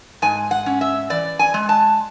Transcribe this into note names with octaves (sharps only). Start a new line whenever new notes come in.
G#2 G#5
F#5
C#4
E5
E3 D5
G#5
G#3
A5